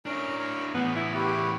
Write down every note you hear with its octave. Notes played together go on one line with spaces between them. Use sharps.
C#4 D4 E4 A#4 A#5
A#4 C#5
E2 A2 B3 G#4
E4
E4 F#4 G4 B4